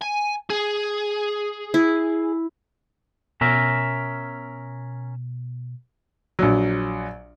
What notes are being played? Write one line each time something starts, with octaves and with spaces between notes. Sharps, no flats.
G#5
G#4
E4
B2 C#4 A#4 E5
A#1 F#3